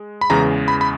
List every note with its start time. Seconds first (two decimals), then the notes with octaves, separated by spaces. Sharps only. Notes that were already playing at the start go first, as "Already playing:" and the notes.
Already playing: G#3
0.21 B5
0.30 E2 C#3 E3 G#3 A#5
0.68 B5
0.81 B5